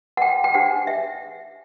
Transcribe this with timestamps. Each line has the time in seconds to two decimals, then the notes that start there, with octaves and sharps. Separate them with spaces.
0.17 F#5
0.22 G5
0.44 G5
0.54 D4 G4 C5 F#5
0.87 E5